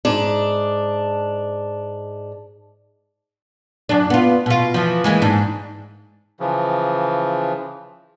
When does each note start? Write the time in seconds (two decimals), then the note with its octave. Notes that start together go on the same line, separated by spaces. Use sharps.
0.05 G#2 D4
3.89 F#2 D4
4.10 B3 F4
4.46 B2 F4
4.74 E3 F3
5.04 E3 G#3 A#3
5.22 G#2 D4
6.40 C#3 E3 F3